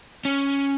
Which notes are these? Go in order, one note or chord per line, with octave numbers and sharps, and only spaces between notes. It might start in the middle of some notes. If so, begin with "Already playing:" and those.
C#4